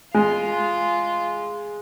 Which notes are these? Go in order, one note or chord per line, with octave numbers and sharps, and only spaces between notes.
G#3 F4